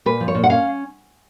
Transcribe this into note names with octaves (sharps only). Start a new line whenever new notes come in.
A#2 B4
F3
C#5
A#2
F#5
C#4 F5